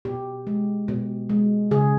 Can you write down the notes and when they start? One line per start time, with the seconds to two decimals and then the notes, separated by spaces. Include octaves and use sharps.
0.05 B2 G4
0.47 G#3
0.88 B2
1.29 G#3
1.71 C#3 G#4